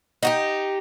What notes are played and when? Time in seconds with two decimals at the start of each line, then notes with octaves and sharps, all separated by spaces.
0.23 D#4 F#4 G4